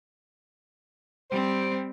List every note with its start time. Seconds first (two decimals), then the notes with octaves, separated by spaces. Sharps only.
1.31 G3 C4 C5